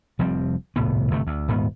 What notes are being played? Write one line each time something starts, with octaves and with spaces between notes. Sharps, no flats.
F1 F3 G3 C4
D#1 C2 A2 B3
G1 C3 A3
D2
D#1 G#2 B3